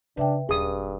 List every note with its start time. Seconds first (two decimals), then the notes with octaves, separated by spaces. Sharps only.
0.17 C#3 D4 B4 E5 G5
0.49 D#1 G2 G#4 D#6